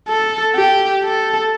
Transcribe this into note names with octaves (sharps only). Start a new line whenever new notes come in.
A4
G4
A4